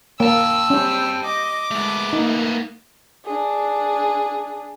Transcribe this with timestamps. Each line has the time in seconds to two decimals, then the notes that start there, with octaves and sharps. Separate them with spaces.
0.20 A#3 G5 A5 E6
0.70 G3 C4 C#4
1.25 D#5 D6
1.71 G#3 A3 B3
2.13 A#3 D#4
3.25 D4 G#4